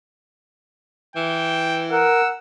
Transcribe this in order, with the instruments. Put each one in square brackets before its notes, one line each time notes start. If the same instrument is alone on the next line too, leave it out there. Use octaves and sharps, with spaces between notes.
[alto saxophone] E3 [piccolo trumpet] G5
[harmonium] A#4 [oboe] F#5 [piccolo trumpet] E6